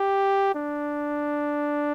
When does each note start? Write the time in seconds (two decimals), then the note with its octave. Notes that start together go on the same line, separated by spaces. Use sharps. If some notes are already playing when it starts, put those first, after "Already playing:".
Already playing: G4
0.55 D4